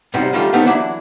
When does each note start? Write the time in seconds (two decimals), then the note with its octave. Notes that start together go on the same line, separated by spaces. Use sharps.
0.14 F#2 C3 G3 C4 D#4 E4
0.33 D3 D#3 G3 A3 F4 A4
0.53 D3 A3 B3 C4 D#4
0.66 E3 F#3 D4 E4